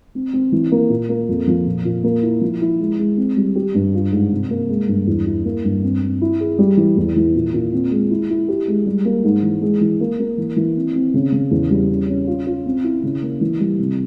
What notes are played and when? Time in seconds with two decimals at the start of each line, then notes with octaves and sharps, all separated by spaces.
0.15 C4
0.33 C4
0.52 E3
0.72 A#3
0.90 A#2
1.09 A#3
1.29 F2
1.47 F3
1.66 A#2
1.85 A#2
2.04 A#3
2.23 E4
2.41 F3
2.61 E4
2.80 G#3
2.99 G#3
3.17 C4
3.37 G3
3.55 G4
3.74 G2
3.94 F4
4.12 G#2
4.32 C3
4.50 A#3
4.69 G#3
4.88 G2
5.07 E2
5.26 E4
5.45 A#3
5.64 G2
5.83 C4
6.02 C4
6.21 E4
6.40 G#4
6.58 G3
6.77 E3
6.97 E2
7.16 E3
7.35 A#2
7.54 A#2
7.73 C4
7.91 G#3
8.11 E4
8.30 E4
8.48 G4
8.68 G#3
8.86 G3
9.05 A#3
9.24 G#2
9.43 E3
9.61 G#3
9.81 E3
10.00 A#3
10.19 A#3
10.38 E3
10.56 E3
10.76 C4
10.95 C4
11.14 C#3
11.32 C#3
11.51 E2
11.70 G3
11.89 C#4
12.08 C#4
12.27 F4
12.46 F4
12.66 C4
12.84 E4
13.03 C#3
13.22 A#3
13.41 E3
13.60 G3
13.79 C3